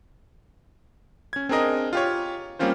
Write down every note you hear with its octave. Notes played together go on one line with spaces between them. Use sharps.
C#4 G#6
C4 D4 G#4 A#4 D#5
F4 G4 C#5
G3 A#3 C4 C#4 F4 C5